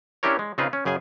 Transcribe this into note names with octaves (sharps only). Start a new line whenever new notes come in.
C#4 D4 E4 G4 A#4 C#5
G#3
C#3 C4 D#4 F4 G#4 B4
C#4
F#2 C#3 G#4 G#5